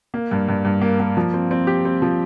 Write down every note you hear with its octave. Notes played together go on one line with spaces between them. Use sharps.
A#3
G2
G2
G2
A#3
A#3
F3
C4
C4
G4
C4
F3